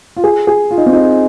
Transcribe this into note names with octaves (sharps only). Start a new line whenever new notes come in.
F4
G#4
G#4
F4
D#4
C4
D#4